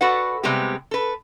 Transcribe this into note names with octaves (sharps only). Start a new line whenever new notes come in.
F#4 A4 B4 D5 F#5
C3 G3 G#3 B3 C4 G4
A4 B4